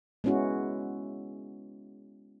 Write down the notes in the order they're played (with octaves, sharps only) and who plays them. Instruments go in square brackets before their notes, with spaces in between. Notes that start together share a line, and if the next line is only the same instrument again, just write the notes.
[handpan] G#3 B3 C#4 E4 F#4